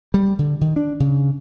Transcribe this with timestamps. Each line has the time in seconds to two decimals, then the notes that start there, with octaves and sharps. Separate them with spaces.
0.14 G3
0.39 D3
0.61 D#3
0.76 D4
1.00 C#3